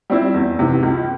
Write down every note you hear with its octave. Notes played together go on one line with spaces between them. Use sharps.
G3 C4 E4
E2
C3 E3
C#2